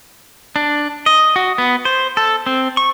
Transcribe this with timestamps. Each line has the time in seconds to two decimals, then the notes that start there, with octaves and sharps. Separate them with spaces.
0.56 D4
1.06 D#5
1.36 F#4
1.58 B3
1.85 C5
2.17 A4
2.46 C4
2.77 C#6